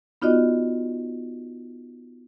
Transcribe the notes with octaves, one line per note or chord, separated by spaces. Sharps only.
B3 D#4 F4 F#4 D5 D#5